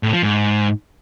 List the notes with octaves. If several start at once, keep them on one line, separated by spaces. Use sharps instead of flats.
A2
F3
G#2